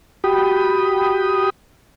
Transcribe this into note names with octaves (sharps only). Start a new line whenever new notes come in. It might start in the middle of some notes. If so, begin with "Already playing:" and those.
F#4 G4 G5 B5 D#6